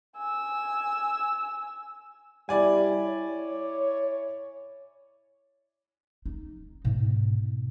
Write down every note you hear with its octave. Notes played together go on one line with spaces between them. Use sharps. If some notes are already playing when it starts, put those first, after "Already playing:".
G#5 E6
G3 E4 D5 G#5
C#5
D#4
G#2 B2